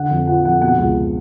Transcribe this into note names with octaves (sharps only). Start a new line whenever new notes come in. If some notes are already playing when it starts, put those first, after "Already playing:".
Already playing: D3 F#5
F2
F3 F#5
F2 F#5
B2 F#5
C#2